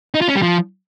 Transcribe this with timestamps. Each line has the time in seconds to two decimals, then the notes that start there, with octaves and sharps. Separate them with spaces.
0.14 D#4
0.21 F4
0.28 C#4
0.35 G3
0.42 F3